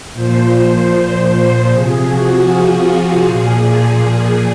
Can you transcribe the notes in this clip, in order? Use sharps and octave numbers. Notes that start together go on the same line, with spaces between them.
A#2 F3 C5
C5
C3 F3 G#4
F#4
F4
F#4
A#2 F3 G#4